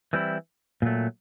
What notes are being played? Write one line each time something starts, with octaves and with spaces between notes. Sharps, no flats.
E3 G3 C4 E4
A#2 F#3 A3